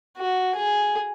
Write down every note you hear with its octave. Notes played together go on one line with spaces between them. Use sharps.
F#4
G#4